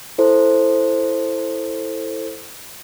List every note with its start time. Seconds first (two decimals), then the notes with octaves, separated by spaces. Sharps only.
0.18 E4 A4 C5